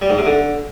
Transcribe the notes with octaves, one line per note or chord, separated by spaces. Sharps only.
G3
G#2
C3
D3